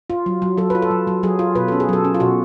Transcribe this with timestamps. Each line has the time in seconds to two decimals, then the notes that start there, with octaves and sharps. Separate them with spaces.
0.10 F4
0.26 F#3
0.42 F#3
0.58 F#3 A4
0.70 F4 B4
0.82 A4
0.91 F#3
1.07 F#3
1.23 F#3 G#4
1.39 F4
1.55 B2 B4
1.68 C#4 A4
1.80 G#4
1.89 F#3 A4
2.04 C#4
2.14 F4
2.20 B2 F#4